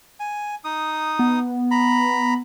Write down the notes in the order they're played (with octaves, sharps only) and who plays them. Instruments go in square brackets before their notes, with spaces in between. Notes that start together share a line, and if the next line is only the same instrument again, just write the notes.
[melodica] G#5
D#4 D#6
[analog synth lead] B3
[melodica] A#5 B5